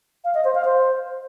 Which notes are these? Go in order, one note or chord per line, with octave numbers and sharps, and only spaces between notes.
F5
D#5
C5
F5
C5